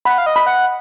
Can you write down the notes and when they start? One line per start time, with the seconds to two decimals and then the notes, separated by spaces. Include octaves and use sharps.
0.05 F#5 B5
0.18 F5
0.26 D#5
0.36 B5
0.46 F#5